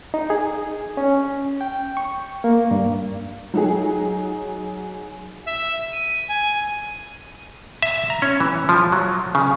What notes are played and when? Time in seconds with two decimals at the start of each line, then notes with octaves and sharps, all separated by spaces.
0.14 D#4
0.30 G#4
0.97 C#4
1.61 G5
1.97 C#6
2.44 A#3
2.71 G2
3.54 F#3 D#4 G#4
5.46 E5
5.92 D#7
6.28 G#5
6.54 D#7
7.82 E5
8.10 A#5
8.22 C#4
8.40 E3
8.69 F3
8.92 F#3
9.35 C#3